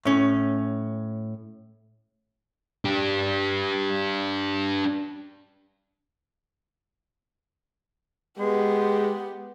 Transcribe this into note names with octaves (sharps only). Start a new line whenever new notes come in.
A2 C#4
D4 G4
G#3 B3 G4